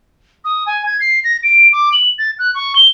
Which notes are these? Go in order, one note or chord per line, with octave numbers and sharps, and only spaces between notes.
D#6
G#5
G#6
C7
A#6
D7
D6
F#7
A6
F#6
C#6
G7